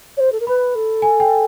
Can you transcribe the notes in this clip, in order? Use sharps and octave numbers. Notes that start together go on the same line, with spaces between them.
C#5
C5
A4
A#4
B4 B5
A4
G#5
G5